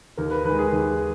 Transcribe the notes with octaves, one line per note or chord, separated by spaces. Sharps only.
D#2 A#4
B4
D#3 G#3 B4
G#4
D#2